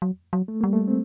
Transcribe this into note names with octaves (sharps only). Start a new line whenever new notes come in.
F#3
F#3
A3
G3 A#3
A3
C4